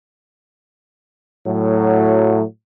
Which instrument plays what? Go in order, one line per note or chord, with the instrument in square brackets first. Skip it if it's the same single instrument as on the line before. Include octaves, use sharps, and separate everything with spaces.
[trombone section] A2 F#3